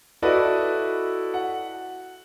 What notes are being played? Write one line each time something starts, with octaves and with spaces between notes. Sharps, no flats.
E4 F#4 A4 B4 D5 D#5
F#5